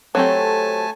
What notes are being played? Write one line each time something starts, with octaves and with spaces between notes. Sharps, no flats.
F#3 A3 C4 G4 A4 C#5 G#5 A5